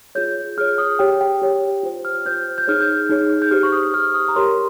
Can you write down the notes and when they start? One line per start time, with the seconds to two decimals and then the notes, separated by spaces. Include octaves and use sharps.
0.15 F4 G#4 C#5 G6
0.57 F4 G#4 C#5 F6
0.78 D#6
0.99 G4 C#5 G5
1.21 G5
1.42 G4 C#5
1.83 F4 C5
2.05 F6
2.26 F4 C5 G6
2.58 G6
2.67 D#4 G#4 C#5 F6
2.81 G6
3.10 D#4 G#4 C#5
3.42 G6
3.51 G4 C5 F6
3.63 C#6
3.72 D#6
3.94 G4 C5 F6
4.14 D#6
4.28 A#5
4.36 G4 A#4 C#5 C6